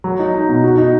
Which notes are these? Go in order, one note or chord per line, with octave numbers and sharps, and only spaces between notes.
F#3
D#4
D#4
B2
F#4
D#4